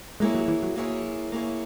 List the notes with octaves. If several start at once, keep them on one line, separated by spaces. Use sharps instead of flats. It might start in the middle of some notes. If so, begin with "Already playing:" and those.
G#3 A#3 E4 G#4 C#5
F#3
E3
F#3
A#3 E4 G#4 C#5
A#3 E4 G#4 C#5